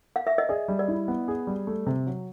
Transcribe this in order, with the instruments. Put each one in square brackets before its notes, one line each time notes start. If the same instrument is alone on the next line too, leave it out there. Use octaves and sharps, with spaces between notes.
[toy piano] F5
E5
D#5
[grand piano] G#4 [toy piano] D5
[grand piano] G3
[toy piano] D5
[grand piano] E4
B3
G#4
G3
A3
C3
F#3